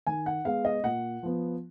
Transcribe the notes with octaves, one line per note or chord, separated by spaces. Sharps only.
D#3 G#5
F#5
G#3 B3 F5
D#5
A#2 F#5
F3 B3